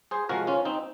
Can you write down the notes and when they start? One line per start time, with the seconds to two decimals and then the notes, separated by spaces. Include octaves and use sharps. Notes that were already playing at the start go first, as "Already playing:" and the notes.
0.11 G#4 C5
0.29 C3 F3 G#3 F#4 A#4
0.47 C#4 F4
0.65 C4 D#4